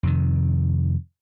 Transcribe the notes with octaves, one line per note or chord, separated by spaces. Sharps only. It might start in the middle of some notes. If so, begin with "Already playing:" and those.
F2 C3 D#3